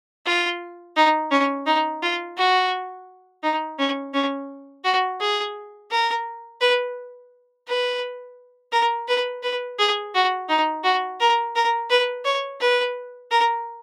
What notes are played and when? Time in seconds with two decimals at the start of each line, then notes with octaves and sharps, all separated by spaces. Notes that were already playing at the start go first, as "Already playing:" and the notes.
0.26 F4
0.96 D#4
1.31 C#4
1.66 D#4
2.02 F4
2.37 F#4
3.43 D#4
3.79 C#4
4.14 C#4
4.84 F#4
5.20 G#4
5.91 A#4
6.61 B4
7.67 B4
8.72 A#4
9.08 B4
9.43 B4
9.79 G#4
10.14 F#4
10.49 D#4
10.84 F#4
11.20 A#4
11.56 A#4
11.90 B4
12.25 C#5
12.60 B4
13.31 A#4